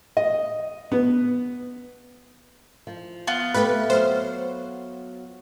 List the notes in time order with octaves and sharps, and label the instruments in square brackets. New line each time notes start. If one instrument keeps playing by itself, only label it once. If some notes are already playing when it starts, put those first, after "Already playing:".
[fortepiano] D#5
B3
[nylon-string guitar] F3
[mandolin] B3 F4
[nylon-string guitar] A3 C4 G4 [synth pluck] B4
[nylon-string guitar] F#3 [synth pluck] C5 F6